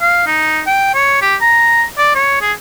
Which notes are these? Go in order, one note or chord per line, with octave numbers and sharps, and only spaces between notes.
F5
D#4
G5
C#5
G4
A#5
D5
C#5
G#4